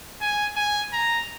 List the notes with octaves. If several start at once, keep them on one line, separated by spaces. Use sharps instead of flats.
G#5
G#5
A#5